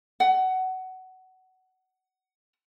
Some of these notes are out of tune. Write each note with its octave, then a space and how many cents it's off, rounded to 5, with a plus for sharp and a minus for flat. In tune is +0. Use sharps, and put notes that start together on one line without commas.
F#5 +20